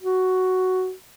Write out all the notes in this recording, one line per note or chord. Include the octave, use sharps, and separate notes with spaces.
F#4